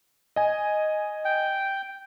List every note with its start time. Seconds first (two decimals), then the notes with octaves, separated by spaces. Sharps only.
0.36 D#5 G#5
1.25 G5